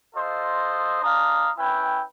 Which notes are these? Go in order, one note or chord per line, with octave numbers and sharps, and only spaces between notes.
F4 A4 C5 D#5
G#3 D4 F5 A#5 D#6
C#4 E4 B4 G5